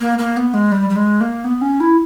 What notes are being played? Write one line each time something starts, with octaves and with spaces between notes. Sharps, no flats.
A#3
A#3
B3
G#3
G3
G3
G#3
A#3
B3
C#4
E4